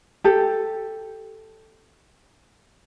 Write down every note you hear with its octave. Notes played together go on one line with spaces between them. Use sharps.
G4 A4